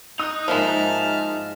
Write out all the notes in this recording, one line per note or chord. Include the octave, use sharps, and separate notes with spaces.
D#4 D#5 D#6 F#6 G6
G#2 F3 G#3 A#3 E5 A5 F6